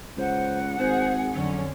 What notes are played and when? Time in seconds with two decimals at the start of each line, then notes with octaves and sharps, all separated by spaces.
0.17 C#2 C5 F#5
0.79 G#1 G#4 C5
1.34 F2 D3 F#3 C#4